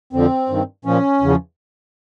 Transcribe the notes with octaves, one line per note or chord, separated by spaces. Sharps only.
F2 D3 F3 C4
G2 D#3
A#2 F3 C#4
E2 C#3 F3